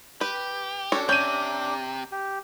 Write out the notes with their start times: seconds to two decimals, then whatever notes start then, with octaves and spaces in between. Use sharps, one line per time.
0.21 G4 B4
0.92 C#4 D4 F#4 A4 D6
1.09 C3 C#4 G6 D#7
2.12 G4